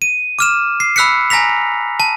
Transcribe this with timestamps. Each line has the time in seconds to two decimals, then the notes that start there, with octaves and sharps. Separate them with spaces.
0.02 D#7
0.39 D6 F6 E7
0.80 C7
0.96 B5 E6 F#6 B6 C#7
1.30 G#5 A#5 A#6 B6 F7
2.00 A5